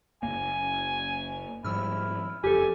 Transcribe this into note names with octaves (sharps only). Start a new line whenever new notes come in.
F#1 F2 A#3 G#5
G#2 F3 G3 E4 E6 F6
F#1 F2 G4 A4 G#5